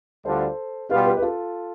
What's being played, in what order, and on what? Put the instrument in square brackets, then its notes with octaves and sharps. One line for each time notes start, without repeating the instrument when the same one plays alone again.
[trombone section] D2 D3 G3 D4 F4 [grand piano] A4 C5
[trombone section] B2 G3 B3 F4 [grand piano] G4 B4
[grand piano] G4 B4
B4
F4 A4